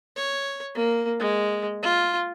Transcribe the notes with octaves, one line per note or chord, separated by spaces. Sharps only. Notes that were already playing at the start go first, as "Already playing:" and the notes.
C#5
A#3
G#3
F4